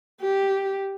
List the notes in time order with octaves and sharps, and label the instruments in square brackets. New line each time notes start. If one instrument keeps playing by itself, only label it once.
[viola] G4